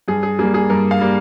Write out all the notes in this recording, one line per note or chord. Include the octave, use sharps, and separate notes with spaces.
G2 G#4
G#4
G3 A#3 G#4
G#4
G2 A#4
F5
G3 A#3